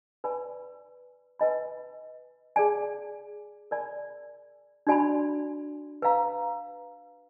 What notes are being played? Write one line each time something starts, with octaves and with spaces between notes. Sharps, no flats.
B4 D5 G#5 B5
B4 D#5 G#5 B5
G#4 D5 G#5
A#4 D5 G#5 B5
D4 F#4 D5 G#5 B5
B4 F5 A#5